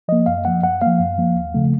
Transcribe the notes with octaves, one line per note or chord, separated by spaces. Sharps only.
F3 A#3 D#5
F#2 F5
F3 A#3 F#5
F#2 F#5
F3 A#3 F5
F#2
F3 A#3
D#2
C#3 F3 A3